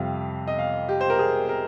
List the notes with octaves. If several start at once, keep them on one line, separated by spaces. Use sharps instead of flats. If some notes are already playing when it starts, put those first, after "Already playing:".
Already playing: F2 C3 G3 F5
D#5
F5
G4
C5
A#4
G#4
A#4